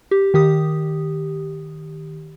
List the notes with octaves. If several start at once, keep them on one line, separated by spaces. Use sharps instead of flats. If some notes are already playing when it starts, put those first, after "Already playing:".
G4
D#3 G4 D#6